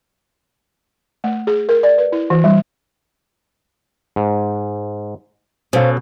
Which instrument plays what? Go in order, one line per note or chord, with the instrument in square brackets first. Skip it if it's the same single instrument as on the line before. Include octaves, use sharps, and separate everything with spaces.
[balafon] A3
G#4
A#4
D5
B4
E4
E3
G3
[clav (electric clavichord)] G#2
[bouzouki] B2 [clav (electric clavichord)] C#4 A4 [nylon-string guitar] C5 F5